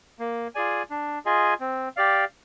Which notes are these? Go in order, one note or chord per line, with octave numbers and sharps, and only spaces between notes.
A#3
F4 G#4 D5 G#5
D4
F4 G#4 D#5 G#5
C4
G4 D5 F5